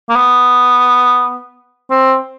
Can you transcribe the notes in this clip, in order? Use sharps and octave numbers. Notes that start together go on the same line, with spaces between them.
A#3
B3
C4